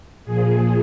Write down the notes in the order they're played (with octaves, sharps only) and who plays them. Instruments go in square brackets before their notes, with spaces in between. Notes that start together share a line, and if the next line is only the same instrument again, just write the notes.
[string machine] A#2 F3 G#4